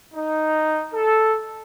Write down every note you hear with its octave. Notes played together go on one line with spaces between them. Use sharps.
D#4
A4